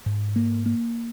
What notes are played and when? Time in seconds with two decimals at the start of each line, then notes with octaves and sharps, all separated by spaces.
0.06 G#2
0.36 A#3
0.66 A#3